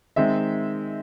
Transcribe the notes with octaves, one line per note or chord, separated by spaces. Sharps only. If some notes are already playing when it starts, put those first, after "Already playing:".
D#3 G#3 C4 E5